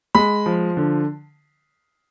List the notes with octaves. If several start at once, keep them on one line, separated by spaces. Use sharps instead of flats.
G#3 B5
F3
D3